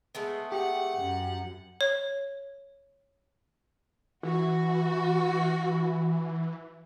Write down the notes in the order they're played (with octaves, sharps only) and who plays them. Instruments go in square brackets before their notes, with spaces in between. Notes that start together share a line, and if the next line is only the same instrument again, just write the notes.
[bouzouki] G#3 A3 B3
[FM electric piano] G4 [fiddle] F#5
[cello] F#2
[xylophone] C#5
[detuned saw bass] E3 [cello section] F#4